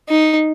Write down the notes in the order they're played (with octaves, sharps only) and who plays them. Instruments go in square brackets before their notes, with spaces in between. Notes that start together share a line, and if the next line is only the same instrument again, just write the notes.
[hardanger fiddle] D#4